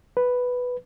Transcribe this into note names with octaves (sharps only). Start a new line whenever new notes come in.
B4